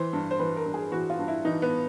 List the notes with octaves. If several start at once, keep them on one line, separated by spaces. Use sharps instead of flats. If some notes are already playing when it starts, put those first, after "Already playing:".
Already playing: E3 C5
G2
C5
E3 B4
A#4
G2
G#4
E3 F#4
F4
G2
E4
E3 D#4
B3